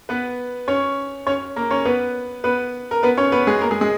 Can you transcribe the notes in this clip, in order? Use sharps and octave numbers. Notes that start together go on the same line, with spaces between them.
B3 B4
C#4 C#5
C#4 C#5
A#3 A#4
C#4 C#5
B3 B4
B3 B4
A#4
B3 B4
C#4 C#5
B3 B4
G#3 G#4
A#3 A#4
G#3 G#4
G#3 G#4